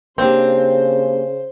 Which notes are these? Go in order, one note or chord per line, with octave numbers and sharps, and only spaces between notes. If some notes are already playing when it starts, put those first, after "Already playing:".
C#3 A#3 C4 D4 G4 C5